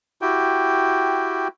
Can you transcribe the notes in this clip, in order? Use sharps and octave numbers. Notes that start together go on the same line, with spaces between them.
E4 F#4 G4 G5